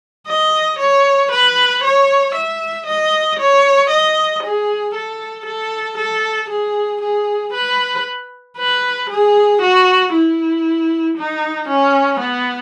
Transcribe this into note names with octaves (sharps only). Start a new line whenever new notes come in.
D#5
C#5
B4
C#5
E5
D#5
C#5
D#5
G#4
A4
A4
A4
G#4
G#4
B4
B4
G#4
F#4
E4
D#4
C#4
B3